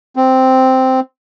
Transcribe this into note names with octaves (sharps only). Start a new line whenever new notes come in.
C4